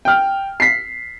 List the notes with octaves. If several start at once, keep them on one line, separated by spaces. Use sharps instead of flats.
G5 F6
B6 C7